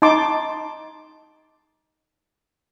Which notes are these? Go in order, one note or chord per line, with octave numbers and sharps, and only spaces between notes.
D#4 A5 C6 D6